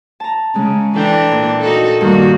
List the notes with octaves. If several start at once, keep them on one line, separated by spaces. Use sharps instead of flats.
A5 A#5
C#3 G#3
E3 D4 A4 G5 A#5
A#2
D#4 F#4 A4
G2 D#3 A#3 F#4